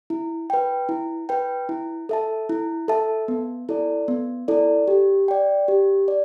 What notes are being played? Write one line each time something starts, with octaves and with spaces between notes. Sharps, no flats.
E4
B4 G5
E4
B4 G5
E4
A4 E5 A5
E4
A4 E5 A5
B3
E4 A4 D5
B3
E4 A4 D5
G4
D5 G5
G4
D5